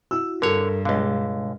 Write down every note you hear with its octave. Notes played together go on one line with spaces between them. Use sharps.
E4 F#4 E6
G2 D3 A4 A#4 C#5
C#2 B2 D3 G#3 F5